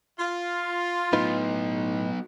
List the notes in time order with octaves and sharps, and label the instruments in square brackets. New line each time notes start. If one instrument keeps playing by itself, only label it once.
[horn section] F4
[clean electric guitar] A2 D#4 B4 [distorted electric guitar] F#3 B3